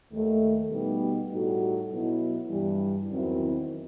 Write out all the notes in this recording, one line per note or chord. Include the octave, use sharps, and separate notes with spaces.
D#2 D#3 A3
B2 G3 B3 D#4 G4
A2 G3 D#4 F#4 A4
B2 F#3 B3 E4
G2 E3 G3
E2 D#3 F#3 C4 E4